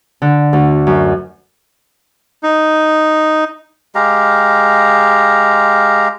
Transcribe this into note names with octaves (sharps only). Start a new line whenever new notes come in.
D3
D2
F#2
D#4
G#3 G4 F5 A#5